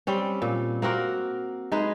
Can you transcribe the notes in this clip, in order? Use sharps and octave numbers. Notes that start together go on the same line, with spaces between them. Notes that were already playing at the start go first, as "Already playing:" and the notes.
G3 C4 C#4
A#2
A#3 C4 F#4 A#4
G#3 D#4 G#4 B4